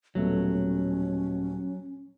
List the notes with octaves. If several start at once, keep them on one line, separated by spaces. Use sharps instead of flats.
D#1 B2 F#3 A3 C#4